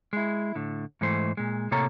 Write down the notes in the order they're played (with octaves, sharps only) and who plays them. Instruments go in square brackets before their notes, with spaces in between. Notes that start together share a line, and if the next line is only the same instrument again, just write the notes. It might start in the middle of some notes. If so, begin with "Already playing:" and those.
[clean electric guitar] G#3 E4
A2 D3
G#2 E3 A3 C5
A#2 G#3
A2 C3 A#3 A4 C#5 A#5